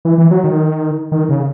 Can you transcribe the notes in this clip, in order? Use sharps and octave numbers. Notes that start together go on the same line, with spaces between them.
E3
E3
F#3
D#3
D#3
C#3